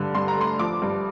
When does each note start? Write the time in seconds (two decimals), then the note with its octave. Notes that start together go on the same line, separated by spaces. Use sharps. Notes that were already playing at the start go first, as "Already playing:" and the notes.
Already playing: G2 D3
0.15 G2 C6
0.28 A#5
0.37 A3 C6
0.59 F3 D6
0.82 G2